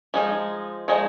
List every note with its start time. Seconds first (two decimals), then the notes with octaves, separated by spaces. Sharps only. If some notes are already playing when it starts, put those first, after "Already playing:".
0.14 F3 G#3 D#4
0.88 F3 G#3 D#4